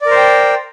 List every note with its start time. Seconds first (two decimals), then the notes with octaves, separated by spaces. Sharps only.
0.01 D5
0.06 A#4
0.11 C5
0.16 G5